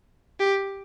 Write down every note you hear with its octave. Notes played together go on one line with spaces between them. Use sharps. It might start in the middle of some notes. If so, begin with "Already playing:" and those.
G4